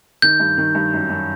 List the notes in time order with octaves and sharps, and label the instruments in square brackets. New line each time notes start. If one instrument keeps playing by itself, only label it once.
[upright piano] D#3 [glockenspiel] G6
[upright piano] G2
D#3
G2
F#2
F#2